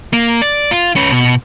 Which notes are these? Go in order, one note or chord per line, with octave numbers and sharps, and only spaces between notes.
A#3
D5
F4
C#4 B4
B2